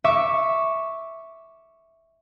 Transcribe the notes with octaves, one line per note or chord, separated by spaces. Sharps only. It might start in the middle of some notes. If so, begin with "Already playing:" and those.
E5 C#6 D6 E7